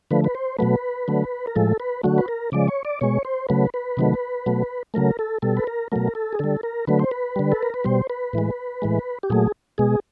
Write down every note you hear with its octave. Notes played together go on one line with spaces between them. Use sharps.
D3 F3 A3 B4
B4
C5
B2 F#3 A3 B4
D3 F#3 A3
A#4
A2 F3 G#3 A4
B4
D3 F#3 A3 F#4
B4
A#4
C#3 F3 G#3 D5
C#5
D5
B2 G#3 C#5
C5
C#3 F#3 A3 B4
B4
C3 D#3 F#3 A3
B2 F#3 A3
C#3 F#3 A3 A#4
A4
B2 G3 A4
B4
A#4
B2 F#3 A3 A#4
A4
G#4
D3 G3 A4
A#4
D3 F#3 A3 B4
C5
B4
D3 G3
A4
A#4
B4
B2 G3 C5
B4
A2 E3 G#3
A2 E3 G#3
G4
A#2 F#3 A3 G#4
B2 G#3 G#4